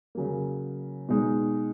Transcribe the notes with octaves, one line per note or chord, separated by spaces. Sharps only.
C#3 F#3 A#3
B2 G#3 D#4